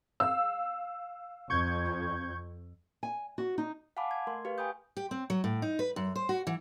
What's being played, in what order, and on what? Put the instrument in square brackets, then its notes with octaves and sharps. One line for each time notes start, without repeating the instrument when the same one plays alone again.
[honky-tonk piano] F5 E6
[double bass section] F2 [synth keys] C#6 G6 G#6
[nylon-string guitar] G#5
F#4
D#4
[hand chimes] F5 F#5 G#5 A5 B5 D6
G#6
A3 A#4 C6
G4 B4 F5
G5 G#5 B5 D#6 G6
[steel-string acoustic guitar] G4
C4
F#3
A2
D#4
B4
F#2
C5
F#4
E3